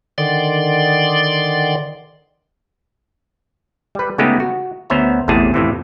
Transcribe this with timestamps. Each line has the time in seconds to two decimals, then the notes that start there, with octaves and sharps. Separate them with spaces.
0.18 D3 D#3 D5 C6
3.95 G3 B4
4.18 C#3 G#3 A3 B3 D#4 G4
4.40 F#4
4.90 D2 B3 C#4 C5 E5 A#5
5.28 A1 E2 A2 C3 G#4 A5
5.54 F2 A2 C3 E3